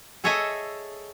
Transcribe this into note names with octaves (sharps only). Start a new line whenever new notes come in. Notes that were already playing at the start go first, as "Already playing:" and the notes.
G#4 A4 C#5 D#5 E5 G#5